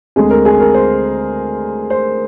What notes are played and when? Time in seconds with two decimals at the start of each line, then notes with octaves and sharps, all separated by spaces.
0.16 D2 D3 G#3 C4 G#4
0.30 A#4
0.45 G#4
0.60 A#4
0.74 C5
1.90 C5